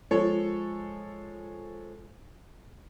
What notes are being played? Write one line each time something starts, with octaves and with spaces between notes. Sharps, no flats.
F3 G#3 A4 C#5